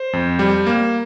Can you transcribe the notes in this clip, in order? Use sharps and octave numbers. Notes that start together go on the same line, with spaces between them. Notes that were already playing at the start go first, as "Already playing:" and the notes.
Already playing: C5
F2
G3
A#3